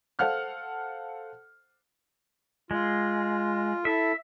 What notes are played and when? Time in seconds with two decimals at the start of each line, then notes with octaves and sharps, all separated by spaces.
0.19 A4 C5 F5 F#5 F6 F#6
2.71 G#3 F4
3.85 E4 A4 E5